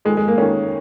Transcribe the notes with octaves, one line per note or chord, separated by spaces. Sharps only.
F2 D#3 G#3
G#3
A#3
F2 D#3 C#4